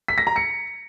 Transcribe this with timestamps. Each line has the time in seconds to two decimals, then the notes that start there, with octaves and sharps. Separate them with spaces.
0.08 B6
0.18 A#6
0.27 A#5
0.36 C#7